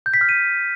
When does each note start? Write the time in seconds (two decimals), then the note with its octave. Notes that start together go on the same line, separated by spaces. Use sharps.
0.06 G6
0.14 B6
0.21 F6
0.29 D#7